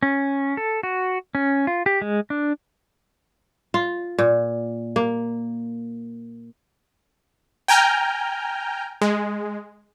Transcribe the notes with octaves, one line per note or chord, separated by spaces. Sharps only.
C#4
A4
F#4
C#4
F4
G4
G#3
D4
F4
A#2
A#3
G5 G#5 A#5 F6 G6
G#3